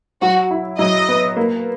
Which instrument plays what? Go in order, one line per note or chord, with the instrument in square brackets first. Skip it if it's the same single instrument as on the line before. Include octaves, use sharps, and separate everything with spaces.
[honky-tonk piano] F#3 [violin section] F#4
[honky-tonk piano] E4
[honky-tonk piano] F#3 [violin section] D#5
[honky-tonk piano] B3
A#3